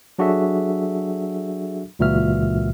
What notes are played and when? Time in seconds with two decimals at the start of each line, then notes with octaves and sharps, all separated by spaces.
0.19 F#3 D4 F#4 G#4 A4 E5
1.99 C#2 A#2 E3 F#4 E5 F6